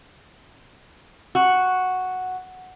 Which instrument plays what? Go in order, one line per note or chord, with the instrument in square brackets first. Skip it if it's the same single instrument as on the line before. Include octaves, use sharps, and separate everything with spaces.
[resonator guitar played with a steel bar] F#4